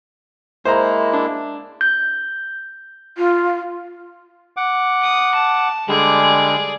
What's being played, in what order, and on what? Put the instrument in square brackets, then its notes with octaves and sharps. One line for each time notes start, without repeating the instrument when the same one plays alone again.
[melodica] G#3 A#3 E4 [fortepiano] C5 A#5
[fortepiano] D4
[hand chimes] G6
[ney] F4
[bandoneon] F#5 D6
[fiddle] D#6
A5
[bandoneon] D3 G3 G#3 [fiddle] G#4 D5